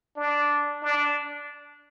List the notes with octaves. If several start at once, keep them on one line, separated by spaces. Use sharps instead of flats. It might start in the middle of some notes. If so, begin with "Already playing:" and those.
D4
D4